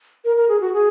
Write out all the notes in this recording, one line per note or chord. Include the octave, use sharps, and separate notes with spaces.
A#4
A#4
G#4
F#4
G#4